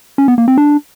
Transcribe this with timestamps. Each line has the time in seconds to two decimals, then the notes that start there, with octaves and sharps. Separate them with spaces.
0.18 C#4
0.28 B3
0.38 A#3
0.48 C4
0.58 D4